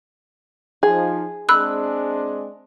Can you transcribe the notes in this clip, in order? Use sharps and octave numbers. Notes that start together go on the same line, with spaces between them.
F3 D#4 G#4
G#3 C4 D4 B5 E6 F#6